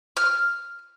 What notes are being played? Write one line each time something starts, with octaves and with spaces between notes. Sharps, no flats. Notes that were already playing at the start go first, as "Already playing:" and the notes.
F6